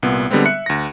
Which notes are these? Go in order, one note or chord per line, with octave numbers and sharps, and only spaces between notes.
C2 A#2 B3
D3 G3 G#3 B3 C4
E5 F#6 C#7
D2 A#6